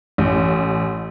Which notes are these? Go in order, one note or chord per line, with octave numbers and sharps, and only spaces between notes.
A1